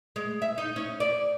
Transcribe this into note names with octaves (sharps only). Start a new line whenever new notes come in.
G#3
E5
D#4
C#4
D5